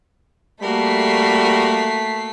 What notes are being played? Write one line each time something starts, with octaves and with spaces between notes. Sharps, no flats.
G3 A3 A#3 F#4 A#4 B6 C7